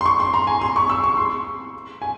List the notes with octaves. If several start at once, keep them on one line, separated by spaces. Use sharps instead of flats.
C6
C#6
C6
A#5
G#5
C6
C#6
E6
C#6
C6
G#5